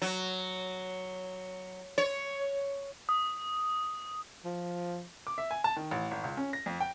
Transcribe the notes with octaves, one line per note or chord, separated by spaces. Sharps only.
F#3
C#5
D#6
F3
D6
E5
G#5
A5
D#3
A1
G#1
C#2
C#4
A#6
F2
G5